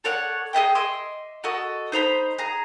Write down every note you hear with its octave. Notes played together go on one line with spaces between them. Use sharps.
A4 C#5 D5 F#5
G#4 D#5 E5 G5
D#5 E5 C6 D6
F#4 A4 D#5
D#4 C5 A#5 B5
G#4 A#5